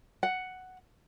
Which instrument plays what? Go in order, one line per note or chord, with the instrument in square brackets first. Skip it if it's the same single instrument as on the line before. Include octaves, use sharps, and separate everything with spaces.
[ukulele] F#5